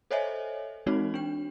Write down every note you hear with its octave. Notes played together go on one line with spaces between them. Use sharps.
A4 C5 C#5 D#5 E5 G#5
E3 G#3 C4 D#4 F#4 C#5
D4 G5